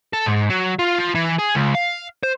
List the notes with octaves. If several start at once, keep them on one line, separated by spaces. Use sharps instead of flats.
A4
G#2
F#3
F4
F3
E3
G#4
C#2
F5
C5